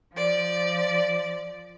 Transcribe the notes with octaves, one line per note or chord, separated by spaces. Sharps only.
F3 D5